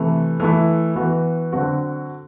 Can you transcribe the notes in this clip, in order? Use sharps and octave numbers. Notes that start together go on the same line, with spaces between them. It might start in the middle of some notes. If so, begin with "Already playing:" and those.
Already playing: C3 E3 A3
E3 A3 E4
E3 B3 F#4
D3 F#3 C4 F#4